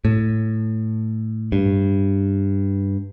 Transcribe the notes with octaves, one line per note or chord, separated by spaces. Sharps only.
A2
G2